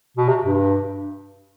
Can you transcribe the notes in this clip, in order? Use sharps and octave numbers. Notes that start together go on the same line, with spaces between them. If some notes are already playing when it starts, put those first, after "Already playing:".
B2
C3
G2